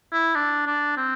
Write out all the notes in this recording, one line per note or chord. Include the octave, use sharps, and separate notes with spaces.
E4
D4
D4
C4